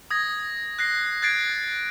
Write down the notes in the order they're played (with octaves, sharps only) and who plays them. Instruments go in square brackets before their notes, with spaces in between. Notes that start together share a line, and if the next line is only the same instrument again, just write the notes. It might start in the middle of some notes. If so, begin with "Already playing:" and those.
[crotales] D#6 G#6 A#6
F#6 A#6 C7
F#6 G#6 A6 C7 D7